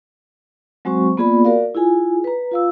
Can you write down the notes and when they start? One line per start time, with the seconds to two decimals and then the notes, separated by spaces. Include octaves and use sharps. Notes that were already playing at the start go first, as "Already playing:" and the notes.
0.85 F#3 G#3 C4 F#4 C5 C#6
1.17 A#3 B3 F4 G#4 D5 B5
1.45 F#4 A#4 D5 F5
1.75 E4 F4 G#4 G#5
2.24 B4 A#5
2.51 F4 F5 E6